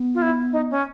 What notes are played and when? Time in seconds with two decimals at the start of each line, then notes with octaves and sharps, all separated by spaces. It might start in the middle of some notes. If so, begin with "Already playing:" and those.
Already playing: B3
0.14 F4
0.22 E4
0.52 D#4
0.71 C#4